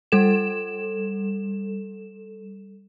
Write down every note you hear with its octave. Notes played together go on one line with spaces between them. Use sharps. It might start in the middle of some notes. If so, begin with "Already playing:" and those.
G3 A4 E7